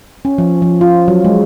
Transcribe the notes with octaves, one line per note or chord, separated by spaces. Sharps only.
C#4
F3
F3
F4
F#3
G#3